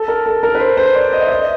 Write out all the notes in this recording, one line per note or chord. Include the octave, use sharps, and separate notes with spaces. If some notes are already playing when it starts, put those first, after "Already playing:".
Already playing: A4
A#4
A4
A#4
B4
C5
C5
D5
D#5
E5
D#5